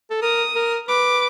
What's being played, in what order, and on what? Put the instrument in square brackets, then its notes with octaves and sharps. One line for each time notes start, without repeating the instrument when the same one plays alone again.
[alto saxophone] A4
[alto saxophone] A#4 [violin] D#6
[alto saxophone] A#4
[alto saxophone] B4 [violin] D6